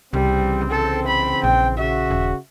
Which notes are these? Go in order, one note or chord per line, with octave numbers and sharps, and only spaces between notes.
C2 C#3 E3 G3 C4
A4
B5
A#1 G5
C#3 F#4 E5
D#1